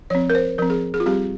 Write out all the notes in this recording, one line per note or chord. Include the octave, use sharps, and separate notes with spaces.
F3 C4 C#5
A#4
C5
F3 C4 A#4
G#4
G#4
F4
G3 C4 G4